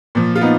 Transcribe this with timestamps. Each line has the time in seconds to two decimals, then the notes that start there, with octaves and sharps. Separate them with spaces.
0.15 A#2 F3
0.36 F4
0.41 B3 D#4